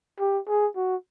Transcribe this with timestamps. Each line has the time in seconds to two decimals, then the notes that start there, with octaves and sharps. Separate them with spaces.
0.20 G4
0.48 G#4
0.76 F#4